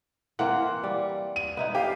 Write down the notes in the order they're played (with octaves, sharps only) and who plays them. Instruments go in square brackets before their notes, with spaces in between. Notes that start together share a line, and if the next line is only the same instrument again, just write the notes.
[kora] E3 A#3 C4 [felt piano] F#5
[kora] G3
[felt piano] D#7
[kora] B3 D#4 E4
[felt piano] G4 [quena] F5